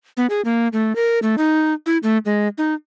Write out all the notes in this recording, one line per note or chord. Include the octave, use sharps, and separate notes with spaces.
B3
G#4
A#3
A3
A#4
A3
D#4
E4
A3
G#3
D#4